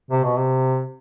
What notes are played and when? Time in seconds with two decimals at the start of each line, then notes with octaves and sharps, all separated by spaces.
0.11 C3
0.24 B2
0.38 C3